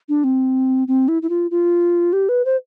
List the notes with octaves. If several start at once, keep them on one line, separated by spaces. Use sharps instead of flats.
D4
C4
C4
E4
E4
F4
F4
G4
B4
C5